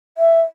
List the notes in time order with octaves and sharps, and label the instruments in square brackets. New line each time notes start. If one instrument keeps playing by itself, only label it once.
[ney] E5